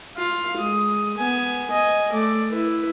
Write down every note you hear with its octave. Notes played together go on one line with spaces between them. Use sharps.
F4 F5
G#3 D#6
B3 G#5
D#5 G#5
A3 D5
E4 B4